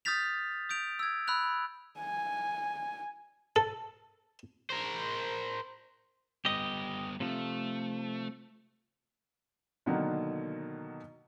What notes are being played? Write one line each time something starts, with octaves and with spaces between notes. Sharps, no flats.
D#6 F6 G6 A6 B6 F7
D#6 G6 D7 F7
E6 G#6
B5 E6 F#6 F7
G#5
A4
A#4 C5
G3 B3 G4 D#5
C3 F3 A3
B2 D3 D#3 F#3 A#3